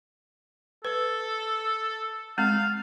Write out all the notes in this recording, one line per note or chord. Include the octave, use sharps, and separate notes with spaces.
A4 B4
G#3 C4 F5